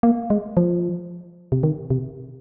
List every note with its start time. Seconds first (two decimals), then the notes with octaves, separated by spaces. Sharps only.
0.03 A#3
0.30 G#3
0.57 F3
1.52 C3
1.63 D#3
1.90 C3